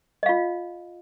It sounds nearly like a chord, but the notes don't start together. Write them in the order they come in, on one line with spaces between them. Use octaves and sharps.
D#5 F5 F4